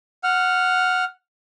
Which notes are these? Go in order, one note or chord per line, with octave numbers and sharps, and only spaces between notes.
F#5 F6